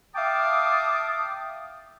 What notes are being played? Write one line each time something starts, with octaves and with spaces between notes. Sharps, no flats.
E5 F5 G5 A5 D6 D#6